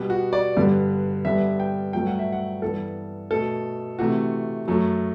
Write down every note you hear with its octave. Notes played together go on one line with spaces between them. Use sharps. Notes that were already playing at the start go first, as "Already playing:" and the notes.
Already playing: B2 G3 B3
F#4
D5
G2 D3 G3 B3
G2 D3 G3 B3 E5
G5
G2 F#3 A3 G5
F#5
E5
F#5
G2 E3 B3 A4
B2 A3 A4
C3 E3 A3 F#4
F#2 F#3 A3